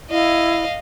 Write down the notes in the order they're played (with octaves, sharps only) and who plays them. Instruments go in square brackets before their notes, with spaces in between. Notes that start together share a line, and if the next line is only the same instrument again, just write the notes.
[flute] E4 [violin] D#5 F5